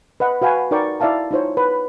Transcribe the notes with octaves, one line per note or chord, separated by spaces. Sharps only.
B4 D#5 F#5
F#4 B4 F5 G5 G#5
D#4 F#4 A#4 D5 G5 C#6
E4 D5 E5 F5 A5 A#5
D#4 F4 C5 C#5
B4